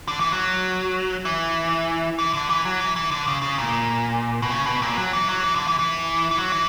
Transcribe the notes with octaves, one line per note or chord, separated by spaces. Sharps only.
D3
E3
F#3
E3
E3
D3
E3
F#3
E3
E3
D3
C#3
C#3
A#2
B2
C#3
B2
A#2
F#3
E3
F#3
E3
D3
E3
E3
E3
F#3
E3